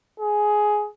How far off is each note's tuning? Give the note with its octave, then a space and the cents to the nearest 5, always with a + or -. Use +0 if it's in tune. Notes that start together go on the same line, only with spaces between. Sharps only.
G#4 +10